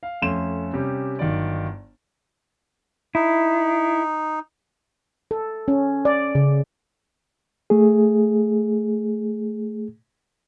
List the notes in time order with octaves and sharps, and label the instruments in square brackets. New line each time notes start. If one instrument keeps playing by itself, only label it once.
[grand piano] F5
F2 A3 C#4 C6 E7
C3 G3 C#4 G4
G1 D#3 F#3 D5
[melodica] D#4 [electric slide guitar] E4
[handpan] A4
C#4
D5
C#3
[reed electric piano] A3 G#4